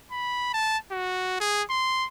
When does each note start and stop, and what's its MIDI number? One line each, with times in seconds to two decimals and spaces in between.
0.12 0.53 83
0.54 0.78 81
0.92 1.38 66
1.40 1.63 68
1.70 2.06 84